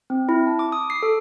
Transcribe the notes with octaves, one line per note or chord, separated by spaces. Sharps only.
C4
E4
A5
D6
D#6
C7
A4